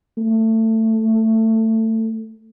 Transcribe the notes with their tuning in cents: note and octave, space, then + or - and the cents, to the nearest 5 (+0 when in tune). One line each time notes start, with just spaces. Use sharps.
A3 +20